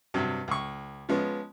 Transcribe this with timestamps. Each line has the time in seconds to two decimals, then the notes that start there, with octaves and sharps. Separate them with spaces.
0.14 G2 C3 F#3
0.48 C#2 C#6
1.09 F3 G#3 B3 C#4